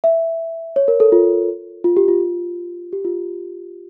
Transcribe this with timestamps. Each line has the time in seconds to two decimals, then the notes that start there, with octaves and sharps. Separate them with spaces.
0.04 E5
0.76 C#5
0.88 A#4
1.00 A4
1.12 F4
1.84 F4
1.97 G4
2.08 F4
2.93 G4
3.05 F4